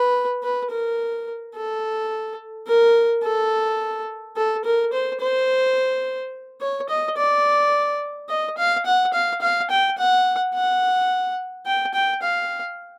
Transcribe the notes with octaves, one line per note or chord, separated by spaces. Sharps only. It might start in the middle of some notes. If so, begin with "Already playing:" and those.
Already playing: B4
B4
A#4
A4
A#4
A4
A4
A#4
C5
C5
C#5
D#5
D5
D#5
F5
F#5
F5
F5
G5
F#5
F#5
G5
G5
F5